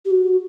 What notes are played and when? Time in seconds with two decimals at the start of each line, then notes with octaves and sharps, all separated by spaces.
0.05 G4
0.10 F#4